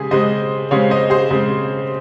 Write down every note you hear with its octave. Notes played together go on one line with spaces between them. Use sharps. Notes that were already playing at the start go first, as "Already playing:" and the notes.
Already playing: C#3 G#3 G4 G#4
C#3 G#3 C4 C5 D#5
C#3 G#3 C4 C#5 F5
C5 D#5
G#4 C5
C#3 G#3 C4